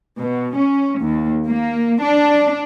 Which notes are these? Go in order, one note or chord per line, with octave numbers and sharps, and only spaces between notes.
B2
C#4
D#2
A#3
D4